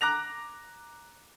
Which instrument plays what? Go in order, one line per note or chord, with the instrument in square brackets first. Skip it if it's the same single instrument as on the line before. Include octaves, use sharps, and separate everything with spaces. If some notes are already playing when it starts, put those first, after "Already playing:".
[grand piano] A#5 D6 F#6 A#6 F7